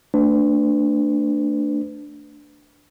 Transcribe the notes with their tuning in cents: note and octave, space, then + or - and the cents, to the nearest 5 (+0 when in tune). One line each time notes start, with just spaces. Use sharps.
A3 +25 D4 +0 B4 +35